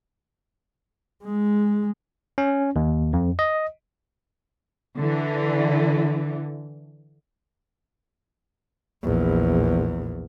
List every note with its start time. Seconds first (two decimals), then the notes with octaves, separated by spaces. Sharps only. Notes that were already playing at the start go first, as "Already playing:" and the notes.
1.25 G#3
2.38 C#4
2.76 D#2
3.13 F2
3.39 D#5
4.97 D3 E3
9.03 A#1 E2